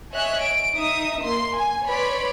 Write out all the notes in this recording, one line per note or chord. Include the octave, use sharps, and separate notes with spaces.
C#5 D#5 E5 G#5 F#6
D7
D#4 E5 D#6
A#3 C6
G#5
B4 C#5 D5 B5 C6